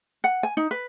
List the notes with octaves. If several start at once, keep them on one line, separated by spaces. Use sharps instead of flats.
F#5
G#5
D#4
B4